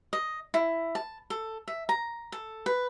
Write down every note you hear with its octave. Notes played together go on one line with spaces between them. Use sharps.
D#5
E4
A5
A4
E5
A#5
A4
B4